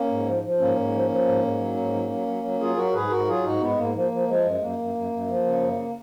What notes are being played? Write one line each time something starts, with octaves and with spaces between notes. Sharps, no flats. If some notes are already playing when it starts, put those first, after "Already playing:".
Already playing: A#3 C#4
G#2
F3
F3
G#2 A#3 C#4
G#2
F3
F3
G#2
G#2
F#3
G#2
F#3
F#3
F#3
F#3
F#3 F4 G#4
F#3 F#4 A#4
G#2 G#4 B4
G#2 F#4 A#4
F#3 F4 G#4
G#2 D#4 F#4
G#2 G#3 B3
G#2 A#3
F3 A#3
F3
F3 G#3
F#2
F#2 A#3
F#2
F#2
F#2
F3
C#3
F#2